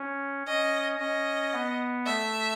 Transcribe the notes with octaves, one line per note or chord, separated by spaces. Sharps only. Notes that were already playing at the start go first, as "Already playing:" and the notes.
Already playing: C#4
C#4 D#5
C#4 D#5
B3
A3 E5